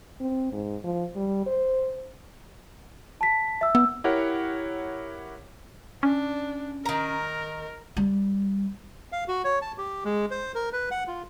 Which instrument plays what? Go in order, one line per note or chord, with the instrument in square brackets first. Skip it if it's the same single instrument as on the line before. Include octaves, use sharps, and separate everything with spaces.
[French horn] C4
G#2
F3
G3
C5
[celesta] A5 B6
E5 E6
[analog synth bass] B3 [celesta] E6
[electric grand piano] E4 G4 A#4 C#5 F#5
[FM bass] C#4 [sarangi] D4
[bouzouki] D#3 A#5 [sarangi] A#4
[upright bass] G3
[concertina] F5
F#4
C#5
A5
G4
G#3
C5
A#4
B4
F#5
F4